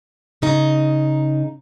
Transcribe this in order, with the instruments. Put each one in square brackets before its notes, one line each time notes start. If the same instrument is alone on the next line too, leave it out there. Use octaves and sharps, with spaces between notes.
[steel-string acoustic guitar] C#3 D#4